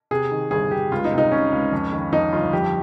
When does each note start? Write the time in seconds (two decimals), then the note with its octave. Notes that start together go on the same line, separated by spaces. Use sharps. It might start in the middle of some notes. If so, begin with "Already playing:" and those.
0.11 C3 G#4
0.31 D#3
0.51 G1 G#4
0.71 G1 G4
0.92 C#2 F4
1.05 D#4
1.11 C3
1.18 D#4
1.31 C3 C#4
1.52 C#2
1.72 F2
1.93 D#3
2.12 F2 D#4
2.32 G1 F4
2.53 F3 G4